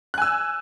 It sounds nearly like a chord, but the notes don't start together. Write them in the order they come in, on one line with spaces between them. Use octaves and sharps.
F#6 G#5 E6